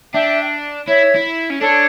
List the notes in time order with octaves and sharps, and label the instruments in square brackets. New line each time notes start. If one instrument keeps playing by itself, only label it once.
[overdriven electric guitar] D4 [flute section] E5 G5
[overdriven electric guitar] E4 [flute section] C#5 E5
[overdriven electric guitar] E4
C#4
[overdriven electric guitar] D4 [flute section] A4 C#5